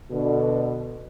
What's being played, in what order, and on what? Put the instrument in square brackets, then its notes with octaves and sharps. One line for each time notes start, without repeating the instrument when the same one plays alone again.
[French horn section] B2 D3